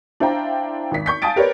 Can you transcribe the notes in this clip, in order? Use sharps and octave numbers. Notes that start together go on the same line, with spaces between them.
D4 E4 C5 F5 G5 A#5
G#1 B6
C#6 G6 B6
F5 G#5 A5 D#6 A6 D7
G4 A#4 B4 C#5 D5